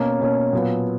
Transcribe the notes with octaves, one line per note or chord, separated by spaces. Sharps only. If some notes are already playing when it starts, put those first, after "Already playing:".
Already playing: B2 A#3 C#4
B2 A#3 C#4
A#2 F#3 B3